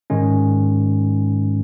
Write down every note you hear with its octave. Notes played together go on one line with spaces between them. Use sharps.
G#2 D#3 G#3 C#4